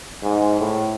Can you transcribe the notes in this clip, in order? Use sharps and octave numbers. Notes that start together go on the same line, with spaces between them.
G#2
A2